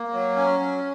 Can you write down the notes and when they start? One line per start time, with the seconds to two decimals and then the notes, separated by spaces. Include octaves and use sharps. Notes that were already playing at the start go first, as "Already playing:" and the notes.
Already playing: A#3
0.13 F#3
0.36 C#4
0.60 F#3